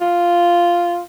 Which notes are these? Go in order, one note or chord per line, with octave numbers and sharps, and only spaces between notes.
F4